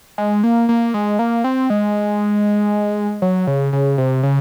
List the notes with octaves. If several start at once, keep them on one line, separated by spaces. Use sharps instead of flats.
G#3
A#3
A#3
G#3
A#3
C4
G#3
F#3
C#3
C#3
C3
C#3